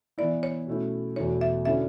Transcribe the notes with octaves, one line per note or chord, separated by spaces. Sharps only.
E3 B3 E4 D5
C#5
B2 A3 C#4 E4
E2 B2 A3 E4 C#5
E5
D3 F#3 C#4 E4 E5